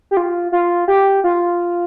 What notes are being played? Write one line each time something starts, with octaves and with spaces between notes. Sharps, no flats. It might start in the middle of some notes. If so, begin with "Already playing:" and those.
G4
F4
F4
G4
F4